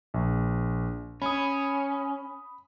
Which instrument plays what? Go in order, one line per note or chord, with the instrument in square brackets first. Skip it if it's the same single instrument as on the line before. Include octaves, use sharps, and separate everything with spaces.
[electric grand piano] A#1
[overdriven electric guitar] C#4 [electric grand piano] B5 D#6